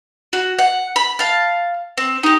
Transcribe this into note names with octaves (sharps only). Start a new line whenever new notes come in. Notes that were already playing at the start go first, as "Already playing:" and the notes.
F#4
F#5
B5
F5 A5
C4
D#4 G4